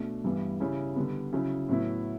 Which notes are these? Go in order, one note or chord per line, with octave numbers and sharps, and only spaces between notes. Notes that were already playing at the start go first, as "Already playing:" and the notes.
Already playing: B2 A3 D4
G2 E3 G3 B3 E4
C#3 G3 C#4 E4
D3 G3 B3
C#3 F#3 C#4 E4
A2 F#3 B3 E4